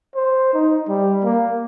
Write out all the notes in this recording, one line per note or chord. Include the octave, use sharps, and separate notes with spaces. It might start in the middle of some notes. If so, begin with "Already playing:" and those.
C5
D#4
G3
A#3